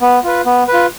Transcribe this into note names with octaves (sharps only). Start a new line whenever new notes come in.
B3
F4 B4
B3
B4
F4